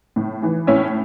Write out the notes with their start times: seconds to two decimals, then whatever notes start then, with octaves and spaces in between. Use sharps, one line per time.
0.16 A2
0.43 E3
0.67 A2 C#4 E4